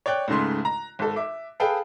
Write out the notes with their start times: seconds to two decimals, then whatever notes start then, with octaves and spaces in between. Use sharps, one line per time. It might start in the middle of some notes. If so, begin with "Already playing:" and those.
0.06 C#5 D5 G5 F#6
0.28 C#2 G#2 C#3 A3 C6
0.65 A#5
0.99 G#1 A4
1.16 E5 D6
1.60 G#4 A4 B4 F5 G5 A5